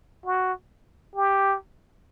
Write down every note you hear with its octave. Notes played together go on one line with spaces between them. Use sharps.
F#4
G4